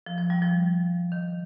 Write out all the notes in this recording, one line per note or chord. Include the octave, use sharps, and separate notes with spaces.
F3
F3
G3
F3
D#3